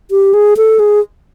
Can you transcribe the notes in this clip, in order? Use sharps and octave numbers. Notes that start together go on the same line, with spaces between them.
G4
G#4
A4
G#4